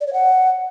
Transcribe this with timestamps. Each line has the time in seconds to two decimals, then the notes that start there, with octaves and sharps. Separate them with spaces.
0.01 D5
0.07 C#5
0.13 F#5